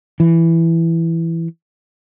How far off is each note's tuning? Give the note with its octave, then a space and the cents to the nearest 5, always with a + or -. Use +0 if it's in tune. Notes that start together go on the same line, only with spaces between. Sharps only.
E3 +5